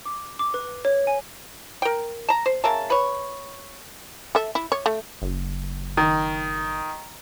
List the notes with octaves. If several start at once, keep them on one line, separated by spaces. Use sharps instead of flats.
D6
D6
B4
C#5
G#5
A#4 G5
A5 A#5
C5
C#3 A#4 E5 A5
B4 C#5
A4 E5
E4
C#5
A3
F#1
D#3